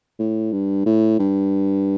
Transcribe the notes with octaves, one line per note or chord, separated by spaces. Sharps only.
A2
G2
A2
G2